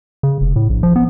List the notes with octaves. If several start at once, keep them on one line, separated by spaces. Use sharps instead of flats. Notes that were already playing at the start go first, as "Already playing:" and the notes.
C#3
F1
A2
A#1
F3
B3